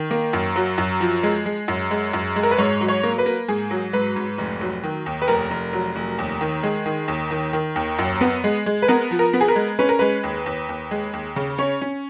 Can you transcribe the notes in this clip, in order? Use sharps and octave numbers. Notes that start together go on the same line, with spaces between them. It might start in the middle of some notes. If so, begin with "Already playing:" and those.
Already playing: D#3
A#3
F#2
F#3
F#2
F3
G#3
G#3
F#2
G#3
F#2
G#3
A#4
B4
G#2 C#5
F#3
C#5
A#3
B4
A#3
G#2 G#4
F#3
G#2 B4
G#2
F1
F#3
D#3
D#2
B4
F1 A#4
F1
F#3
F1
D#2
D#3
G#3
D#3
D#2
D#3
D#3
D#2
F#2
B3
G#3
G#3
B4
B3 A#4
F3
A#4
B3
G#4
A#4
G#3
C#4 B4
A#4
G#3 B4
D#2
D#2
D#2
G#3
D#2
C#3
C#4 C#5
C#4